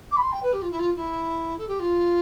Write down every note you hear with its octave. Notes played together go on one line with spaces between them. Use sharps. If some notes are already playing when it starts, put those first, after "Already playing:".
D6
B5
C6
G5
B4
G4
F4
E4
F4
E4
A4
G4
F4